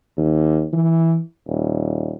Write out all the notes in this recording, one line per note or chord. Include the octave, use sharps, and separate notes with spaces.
D#2
E3
D#1